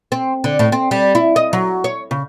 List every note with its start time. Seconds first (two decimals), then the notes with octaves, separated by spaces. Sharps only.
0.12 C4
0.44 D3
0.59 A2
0.72 C4
0.91 G3
1.15 E4
1.36 D#5
1.53 F#3
1.84 C#5
2.11 C#3